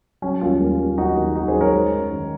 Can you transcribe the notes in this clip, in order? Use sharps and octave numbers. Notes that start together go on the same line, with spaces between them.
F#3 C#4
D#2 C#4 F4
D#2
D#2
F#3 D#4 F#4
D#2
D#2 D#4 F#4
G#4 C5
F#3
A#4 C#5
G#3
F#2
D#3